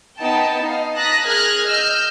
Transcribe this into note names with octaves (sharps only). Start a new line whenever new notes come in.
B3 D#4 G5 A5
D#4 F5
A5 A#5 D#6 F#6 A#6 B6
G#4 A#4 F6 F#6 G#6 A#6
D#5 E6 F6 G6